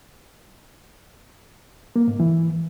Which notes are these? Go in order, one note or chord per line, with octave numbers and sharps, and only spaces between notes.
A#3
G#2
E3